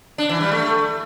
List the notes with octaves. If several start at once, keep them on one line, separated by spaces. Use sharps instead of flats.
D4
E3
G3
A3